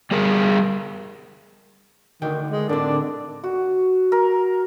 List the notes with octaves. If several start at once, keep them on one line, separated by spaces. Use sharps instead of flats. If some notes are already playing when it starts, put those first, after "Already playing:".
G3 G#4 A#4
D2 D3 D#3 G5
G#3
A2 D3 D#3 C4 D4 D5
F#4
A#4